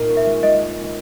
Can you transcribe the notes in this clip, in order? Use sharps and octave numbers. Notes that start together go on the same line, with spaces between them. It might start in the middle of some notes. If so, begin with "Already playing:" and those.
Already playing: A#2 A#3 D#4 F4
C#4
E5
G#3
G#3 D#5